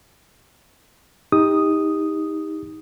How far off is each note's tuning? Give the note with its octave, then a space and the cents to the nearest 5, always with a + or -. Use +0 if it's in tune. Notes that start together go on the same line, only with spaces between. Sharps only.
D#4 +20 G4 +30 D#6 +0